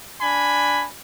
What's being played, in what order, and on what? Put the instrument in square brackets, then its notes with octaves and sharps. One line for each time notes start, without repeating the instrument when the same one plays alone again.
[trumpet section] D4 G#5 B5